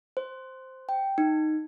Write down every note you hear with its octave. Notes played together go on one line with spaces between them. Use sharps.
C5
G5
D#4